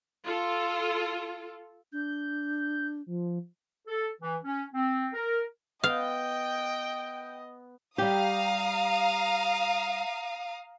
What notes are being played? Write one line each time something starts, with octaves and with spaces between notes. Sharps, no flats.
F4 A4
D4 G6
F3
A4
E3
C#4
C4
A#4
B3 D#5 F5 G5
G3 G4 F5 A#5 D#6